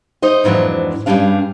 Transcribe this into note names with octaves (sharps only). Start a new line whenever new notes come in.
D#4 C5 D#5
F2 G#2 E3 F#3 D4
G2 F3 G3 C#4 D4 F5